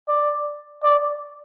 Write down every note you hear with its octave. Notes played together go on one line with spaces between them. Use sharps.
D5
D5